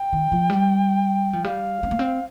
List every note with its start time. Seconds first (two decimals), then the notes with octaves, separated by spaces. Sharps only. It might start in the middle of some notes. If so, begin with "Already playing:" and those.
Already playing: G5
0.13 D#3
0.32 F3
0.50 G3
1.33 F3
1.44 G3 F5
1.83 C4
1.91 A#3
1.99 C4